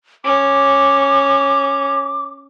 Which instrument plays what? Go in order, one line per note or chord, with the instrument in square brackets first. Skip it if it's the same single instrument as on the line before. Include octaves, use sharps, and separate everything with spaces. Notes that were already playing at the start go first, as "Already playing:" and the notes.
[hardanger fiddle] C#4 [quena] D6